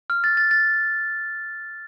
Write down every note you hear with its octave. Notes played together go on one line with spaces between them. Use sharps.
F6
A6
A6
A6